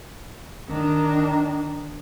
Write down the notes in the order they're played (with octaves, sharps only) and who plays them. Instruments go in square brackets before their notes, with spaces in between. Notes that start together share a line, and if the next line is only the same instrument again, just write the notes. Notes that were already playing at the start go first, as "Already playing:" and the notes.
[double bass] D#3 D4